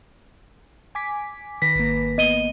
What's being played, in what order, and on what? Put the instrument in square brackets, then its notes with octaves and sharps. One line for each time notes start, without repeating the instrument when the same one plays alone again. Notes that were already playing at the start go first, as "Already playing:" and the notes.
[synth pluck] G#5 D6 B6
[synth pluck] D#3 B4 A#6 [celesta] B6
[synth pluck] G#1 A#3
[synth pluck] B3 [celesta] D#5 D#7 G7